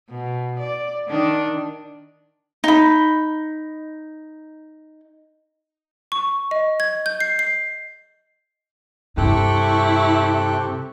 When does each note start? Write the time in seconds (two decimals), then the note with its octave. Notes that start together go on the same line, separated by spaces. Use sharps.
0.10 B2
0.59 D5
1.07 D#3 D4
2.64 D#4 B5
6.12 C#6
6.51 D#5
6.80 G#6
7.06 G6
7.20 C7
7.39 C7
9.17 G2 C3 E4 A4 G5 C#6 F#6